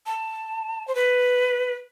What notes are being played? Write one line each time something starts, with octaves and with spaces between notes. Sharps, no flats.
A5
C5
B4